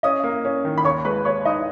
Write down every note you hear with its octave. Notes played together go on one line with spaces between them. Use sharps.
C#4 D#5 D#6
A#3
C#4
D#3
B5
D#2 C#5 C#6
G#3 B4 B5
D#2 C#5 C#6
D#4 D#5 D#6